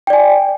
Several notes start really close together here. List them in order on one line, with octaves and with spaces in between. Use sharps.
G5 D5 G#5